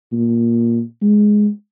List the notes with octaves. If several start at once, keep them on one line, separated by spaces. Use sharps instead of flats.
A#2
G#3